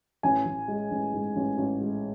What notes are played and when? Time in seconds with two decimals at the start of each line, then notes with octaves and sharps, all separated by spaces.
0.23 A1 G#5
0.46 A1
0.68 G#3
0.91 A1
1.13 G#2
1.36 A1
1.58 A1
1.80 G#3